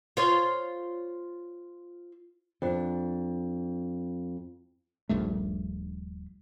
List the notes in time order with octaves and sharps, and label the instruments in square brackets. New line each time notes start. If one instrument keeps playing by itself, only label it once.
[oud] F4 C5 C#5
[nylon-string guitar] F2 D4
[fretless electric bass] D#1 A#1 G2 A3